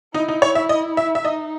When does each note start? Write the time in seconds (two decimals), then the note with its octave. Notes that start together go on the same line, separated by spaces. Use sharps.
0.14 D#4 E4
0.28 D#4
0.42 C#5
0.55 E5
0.69 D#5
0.97 E5
1.15 E5
1.24 D#4 D#5